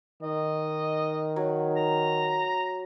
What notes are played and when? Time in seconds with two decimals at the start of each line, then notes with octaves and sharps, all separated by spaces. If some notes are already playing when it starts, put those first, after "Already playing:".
0.23 D#3 D#5
1.36 F#3
1.77 A#5